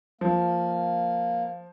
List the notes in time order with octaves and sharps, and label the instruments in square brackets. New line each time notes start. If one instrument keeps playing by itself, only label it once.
[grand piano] F3 [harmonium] A#3